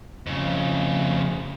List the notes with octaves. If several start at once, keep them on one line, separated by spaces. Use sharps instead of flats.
F2 C#3